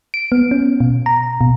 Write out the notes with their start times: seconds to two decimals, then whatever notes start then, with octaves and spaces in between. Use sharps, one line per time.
0.14 D7
0.32 B3
0.51 C#4
0.80 B2
1.06 A#5
1.41 B2